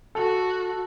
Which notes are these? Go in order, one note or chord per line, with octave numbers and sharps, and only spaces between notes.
F#4 A4